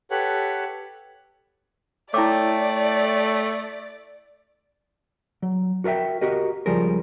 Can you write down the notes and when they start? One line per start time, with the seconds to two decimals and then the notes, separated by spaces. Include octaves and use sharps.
0.11 G4 A4 B4 C#5 F#5
2.14 A3 E4 C#5 D5 G5 A5 D6
5.42 F#3
5.84 F#4 A#4 C#5 E5 G5
6.21 F#4 G4 A#4 D#5
6.66 C#2 F3 G3 G#4 A#4